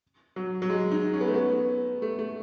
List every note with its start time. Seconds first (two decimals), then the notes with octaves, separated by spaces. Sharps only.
0.36 F#3
0.62 F#3
0.70 G#3
0.91 D#4
1.14 C#4
1.21 B3
1.28 A3
1.34 B3
2.02 A3
2.19 A3